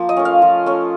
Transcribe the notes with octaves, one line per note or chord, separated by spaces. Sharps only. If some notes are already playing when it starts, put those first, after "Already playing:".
Already playing: F3 A#3
D#5
A3 C#4
F5
F3
A3 C#4